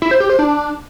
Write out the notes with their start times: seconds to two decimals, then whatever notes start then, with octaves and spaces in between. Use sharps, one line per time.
0.02 E4
0.11 C5
0.20 G4
0.30 C5
0.39 D4